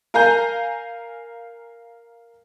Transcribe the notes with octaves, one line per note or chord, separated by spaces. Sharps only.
A#4 F5 G#5 A#5 G6